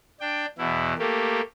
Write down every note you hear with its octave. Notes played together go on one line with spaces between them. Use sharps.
D4 G5
E2 B2 E4
A3 A#3 G4